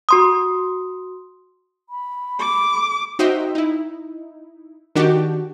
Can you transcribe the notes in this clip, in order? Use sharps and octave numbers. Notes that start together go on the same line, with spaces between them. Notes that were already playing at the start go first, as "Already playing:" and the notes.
F#4 C6 D#6
B5
D6
D#4 F#4 C5 D#5 E5 G5
D#4 E4
D#3 D4 F#4 G4